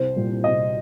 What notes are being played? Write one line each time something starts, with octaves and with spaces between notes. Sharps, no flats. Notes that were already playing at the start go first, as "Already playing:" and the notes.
Already playing: C2 C5
A#2 G3
C2 D#5